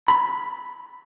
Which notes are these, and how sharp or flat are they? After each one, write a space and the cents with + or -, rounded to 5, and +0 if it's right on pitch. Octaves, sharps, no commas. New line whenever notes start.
B5 -5